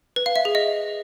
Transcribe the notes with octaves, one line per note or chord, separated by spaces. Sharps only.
B4
F5
E5
G#4
D#5